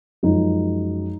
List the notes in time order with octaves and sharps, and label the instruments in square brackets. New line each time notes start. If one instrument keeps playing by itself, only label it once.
[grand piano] F#2 F3 G#3 D#4